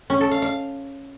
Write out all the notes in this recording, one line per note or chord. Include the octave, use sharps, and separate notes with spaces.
C#4
A4
F5
F5